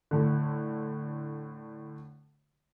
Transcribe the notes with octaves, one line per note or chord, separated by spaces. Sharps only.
A2 D3